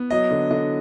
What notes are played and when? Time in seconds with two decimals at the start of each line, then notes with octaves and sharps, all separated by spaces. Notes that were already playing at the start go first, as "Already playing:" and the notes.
Already playing: B3
0.10 F#3 D#5
0.31 D3
0.50 D3 D#5